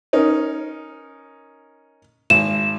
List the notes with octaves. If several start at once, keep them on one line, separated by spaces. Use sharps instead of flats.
C#4 D#4 A#4
G#1 E7